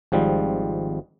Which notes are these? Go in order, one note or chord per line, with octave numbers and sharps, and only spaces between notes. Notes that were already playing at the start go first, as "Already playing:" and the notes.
G#1 G#2 F3 G3